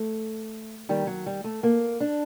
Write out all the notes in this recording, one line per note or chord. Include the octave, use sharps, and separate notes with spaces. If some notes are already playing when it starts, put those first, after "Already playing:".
Already playing: A3
D#2 D#3 G3
F#3
G3
A3
A#3
D4